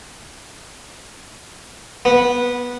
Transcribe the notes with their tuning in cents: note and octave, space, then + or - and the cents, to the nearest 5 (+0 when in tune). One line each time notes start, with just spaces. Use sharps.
B3 -15